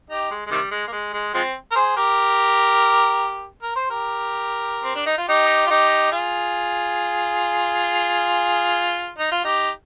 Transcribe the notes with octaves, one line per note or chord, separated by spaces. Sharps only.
D#4 G4
G#3
G#3
C3 D#3 G3
G#3
A#3
G#3
G#3
F3 G#3 C4
A#4
G#4 C5
G4 A#4
A#4
C5
G4 A#4
C4
D4
D#4
F4
D#4 G4
F4
D#4 G4
F4 G#4
D#4
F4
D#4 G4